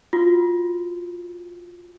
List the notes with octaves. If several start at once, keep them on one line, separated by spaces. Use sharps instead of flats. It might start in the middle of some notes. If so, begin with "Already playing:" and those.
F4 F#4